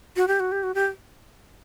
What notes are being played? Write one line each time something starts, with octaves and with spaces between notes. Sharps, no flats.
F#4
G4
F#4
G4
F#4
G4